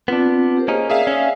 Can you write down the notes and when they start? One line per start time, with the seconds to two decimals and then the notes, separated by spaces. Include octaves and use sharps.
0.08 B3 C4 D4 F4
0.57 G4 A#4 C5
0.68 A#3 C#4 D#4 G#4
0.90 G#4 D5 E5 F5
1.07 C#4